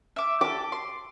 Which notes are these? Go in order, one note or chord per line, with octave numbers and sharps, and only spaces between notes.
E5 D6
G4 A4 D6
C6